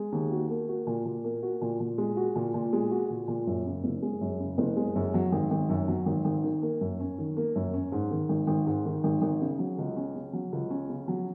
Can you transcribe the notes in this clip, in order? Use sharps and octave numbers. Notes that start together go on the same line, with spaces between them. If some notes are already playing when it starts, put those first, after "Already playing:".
Already playing: G#3
D#2
F#4
A#3
F#4
A#2
A#2
A#3
F#4
A#2
A#2
G#3
F#4
A#2
A#2
G#3
F#4
A#2
A#2
F#2
C#3
F#1
G#3
F#2
C#3
F#1
G#3
F#2
F#3
G#1
G#1
F#2
F#3
G#1
G#1
D#3
A#3
F#2
C#4
D#3
A#3
F#2
C#4
G#2
D#3
G#1
G#1
G#2
D#3
G#1
G#1
C#3
F#3
C#2
C#4
C#3
F#3
C#2
C#4
C#3
F#3